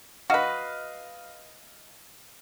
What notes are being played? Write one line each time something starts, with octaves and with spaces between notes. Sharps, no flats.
F#4 B4 D#5 F5